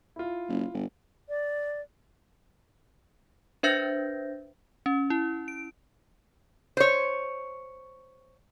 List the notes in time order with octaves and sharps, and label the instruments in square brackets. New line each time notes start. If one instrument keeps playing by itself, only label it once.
[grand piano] E4 F4
[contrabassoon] F#1
G1
[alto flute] D5
[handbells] D4 B4 C5 E5 G6 A#6
[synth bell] C#4
E4
D7
[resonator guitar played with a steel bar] C5 C#5